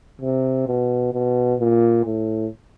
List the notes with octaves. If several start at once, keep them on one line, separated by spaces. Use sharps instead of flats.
C3
B2
B2
A#2
A2